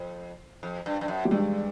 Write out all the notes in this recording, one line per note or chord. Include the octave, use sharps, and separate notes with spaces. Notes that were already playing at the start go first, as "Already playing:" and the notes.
Already playing: F2
F2
G2
G2
F#2
G3
G2 G#3